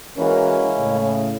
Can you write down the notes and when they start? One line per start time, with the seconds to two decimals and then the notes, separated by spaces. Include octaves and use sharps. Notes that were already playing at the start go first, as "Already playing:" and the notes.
0.18 E3 G#3 A#3 C#4 E4 F#4 A#4
0.77 A2 C#3